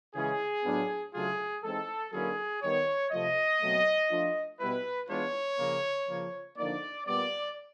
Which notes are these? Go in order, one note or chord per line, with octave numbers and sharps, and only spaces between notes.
C#3 E3 G#3 C#4 G#4
A2 F#3 B3 D4 F4
C#3 F#3 A3 D4 F4 G#4
E3 G#3 C4 D#4 A4
D3 F#3 A#3 C#4 E4 G#4
D#3 G3 B3 C#5
C3 F3 A3 D#5
B2 F#3 A3 C4
F3 A3 D4 F4
B2 G3 B3 E4 B4
E3 G#3 B3 D4 F4 C#5
C#3 F3 A#3
C#3 F3 A#3
D3 F3 A#3 D#4 D5
A#2 G3 B3 D5